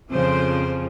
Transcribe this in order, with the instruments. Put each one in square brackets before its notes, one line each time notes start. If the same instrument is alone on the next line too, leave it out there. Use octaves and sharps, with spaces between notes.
[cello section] F2 C#3 F3 C5